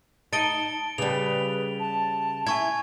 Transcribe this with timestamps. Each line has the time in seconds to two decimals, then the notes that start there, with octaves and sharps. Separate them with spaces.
0.33 D#4 A5 A6 D7 G7
0.98 C#3 G3 B4 F7
1.80 A5
2.47 E4 G#5 C#6 G#6